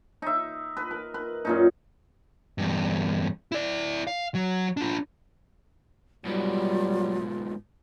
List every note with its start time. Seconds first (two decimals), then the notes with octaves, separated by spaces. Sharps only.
0.22 D#4 E5
0.77 B4
0.91 A#4
1.14 B4
1.45 F#2 A#2 D#4
2.58 E2 G2
3.52 E4 D5
4.07 F5
4.35 F#3
4.77 D4 F4
6.25 G#2 B2 F#3 G3 F4